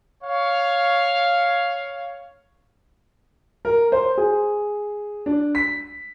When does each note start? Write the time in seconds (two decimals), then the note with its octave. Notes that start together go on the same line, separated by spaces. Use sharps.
0.23 C#5 F5
3.65 A#4
3.92 C5
4.18 G#4
5.26 D4
5.55 B6